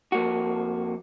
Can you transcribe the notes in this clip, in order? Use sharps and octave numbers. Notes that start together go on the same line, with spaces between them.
F2 A#3 F#4